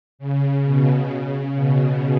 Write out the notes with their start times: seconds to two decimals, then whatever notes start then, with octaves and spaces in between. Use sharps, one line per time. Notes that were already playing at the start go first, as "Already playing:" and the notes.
0.19 C#3
0.63 B2
1.09 C#3
1.55 B2